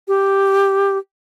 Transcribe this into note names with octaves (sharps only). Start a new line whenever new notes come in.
G4